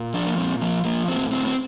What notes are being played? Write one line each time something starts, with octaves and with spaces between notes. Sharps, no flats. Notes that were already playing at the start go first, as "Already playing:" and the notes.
Already playing: A#2
F3 D4
A#3
A#2 C4
F3 A#3
F3 A#3
A2 C4
A2 C4
C4